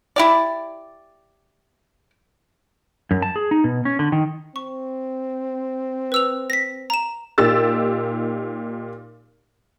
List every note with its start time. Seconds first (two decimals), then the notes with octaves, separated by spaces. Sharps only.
0.16 E4 G4 D5
3.11 F#2
3.22 A5
3.36 G#4
3.51 D#4
3.64 B2
3.85 C#4
3.99 D3
4.12 D#3
4.56 C4 C#6
6.12 B4 E6 F7
6.50 A#6 B6
6.90 A#5 E7
7.38 A#2 D#4 G4 E6 A6